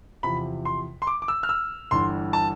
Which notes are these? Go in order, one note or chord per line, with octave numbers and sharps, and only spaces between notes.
E2 C3 F3 B5
C6
C6
D6
D6
E6
F6
E6
G1 G2 E3 C6
A5